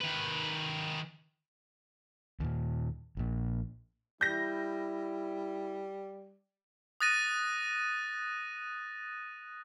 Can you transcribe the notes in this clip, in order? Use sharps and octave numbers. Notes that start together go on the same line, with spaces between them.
D#3 B4
D#2 A#2
A#1 A#2
G3 E4 G6 A#6
D#6 F#6 A6 A#6 D#7